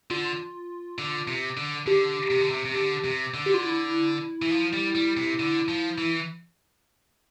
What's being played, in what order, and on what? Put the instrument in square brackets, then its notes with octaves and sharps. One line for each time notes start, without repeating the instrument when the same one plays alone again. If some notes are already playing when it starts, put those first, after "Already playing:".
[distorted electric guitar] D3 [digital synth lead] F4
[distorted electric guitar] D3
C3
D3
[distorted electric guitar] D3 [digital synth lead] G4
[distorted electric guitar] C3
D3
C3
C3
D3
C3
D3
[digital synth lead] G4
F4
E4
[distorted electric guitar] E3
F3
G3
G3
C3
D3
F3
E3